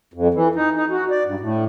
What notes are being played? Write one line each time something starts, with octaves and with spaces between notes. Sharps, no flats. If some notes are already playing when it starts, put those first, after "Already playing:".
F2
E3
D#4
D#4
F#4
D5
G2
A2